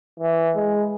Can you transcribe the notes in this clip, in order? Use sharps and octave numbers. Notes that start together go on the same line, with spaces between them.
E3
G#3